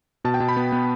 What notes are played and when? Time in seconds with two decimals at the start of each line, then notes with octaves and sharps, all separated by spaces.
0.25 B2 A5
0.34 G5
0.40 B2 A5
0.48 B5
0.57 B3
0.72 B3